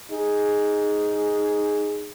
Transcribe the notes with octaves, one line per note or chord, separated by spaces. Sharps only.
D#4 G#4